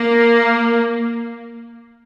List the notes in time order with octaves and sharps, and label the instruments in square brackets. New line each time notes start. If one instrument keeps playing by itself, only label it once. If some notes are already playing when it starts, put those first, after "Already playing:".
Already playing: [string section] A#3